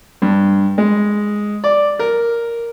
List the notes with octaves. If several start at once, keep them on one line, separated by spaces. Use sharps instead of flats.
G2
G#3
D5
A#4